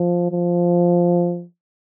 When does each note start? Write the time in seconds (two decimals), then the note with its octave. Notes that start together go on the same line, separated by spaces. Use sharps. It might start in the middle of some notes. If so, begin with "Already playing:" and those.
Already playing: F3
0.32 F3